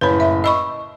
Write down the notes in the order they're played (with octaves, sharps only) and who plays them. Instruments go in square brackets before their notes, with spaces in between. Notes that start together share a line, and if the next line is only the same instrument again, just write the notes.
[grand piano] F#1 A2 B5 [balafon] B4 C#5
[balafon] E5
[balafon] D#5 B5 C#6 [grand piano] E6